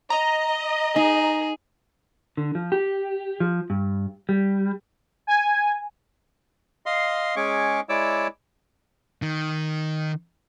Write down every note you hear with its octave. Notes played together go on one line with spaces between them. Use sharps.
D#5 A#5
D#4 G#4
D3
F3
G4
F3
G2
G3
G#5
D#5 F5 C6
G#3 C#4 G#4 C#6 D6
G#3 E4 C#5 D5 D6 E6
D#3